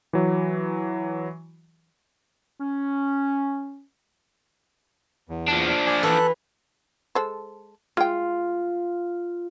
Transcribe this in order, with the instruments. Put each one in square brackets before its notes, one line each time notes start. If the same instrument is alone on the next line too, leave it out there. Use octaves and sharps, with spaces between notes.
[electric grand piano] E3 F#3
[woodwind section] C#4
[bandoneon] E2
[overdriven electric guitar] F3 D4
[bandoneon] D5 G#5
[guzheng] E3 F#4 B4 [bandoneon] A4 F#6
[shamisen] G#3 A4 C5
[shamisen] G#3 G5 [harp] F4